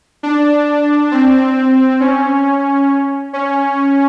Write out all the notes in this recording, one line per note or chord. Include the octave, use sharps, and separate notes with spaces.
D4
C4
C#4
C#4